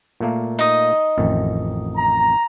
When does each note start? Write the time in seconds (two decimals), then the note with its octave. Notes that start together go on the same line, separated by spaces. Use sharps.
0.20 A#2 A3 A#3
0.59 D#4 D#5
1.18 A1 F2 D#3
1.96 A#5